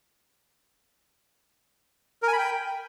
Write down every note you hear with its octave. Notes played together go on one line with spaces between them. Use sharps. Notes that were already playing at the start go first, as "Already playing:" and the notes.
A#4
G#5
B5
G5